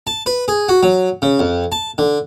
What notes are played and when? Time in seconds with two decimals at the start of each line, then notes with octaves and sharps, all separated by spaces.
0.07 A5
0.26 B4
0.48 G#4
0.69 F#4
0.83 F#3
1.22 C#3
1.39 F2
1.72 A5
1.98 D3